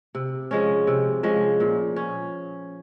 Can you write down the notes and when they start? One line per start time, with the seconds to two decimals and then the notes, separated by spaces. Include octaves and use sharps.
0.15 C3
0.51 F3 G#3 C#4
0.87 C3
1.23 F3 G#3 C#4
1.60 A#2
1.96 C#4